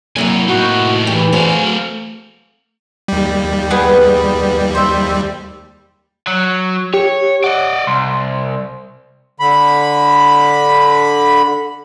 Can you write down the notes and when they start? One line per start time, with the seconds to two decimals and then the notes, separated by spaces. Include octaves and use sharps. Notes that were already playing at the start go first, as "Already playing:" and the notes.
0.16 C3 F#3 A#3 E4 G#5
0.48 A2 D#4 F#4
1.07 E3 G4
1.33 A3 F#4 G#4 C5 F5
3.08 D#2 G3
3.70 B3 G#4 B4
4.75 C5 E5
6.27 F#3
6.94 G4 C#5
7.44 D5 D#5 F#5
7.87 C2 C6
9.40 D3 B5